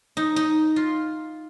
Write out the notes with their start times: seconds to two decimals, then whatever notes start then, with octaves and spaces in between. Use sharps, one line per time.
0.17 D#4
0.36 D#4
0.76 F4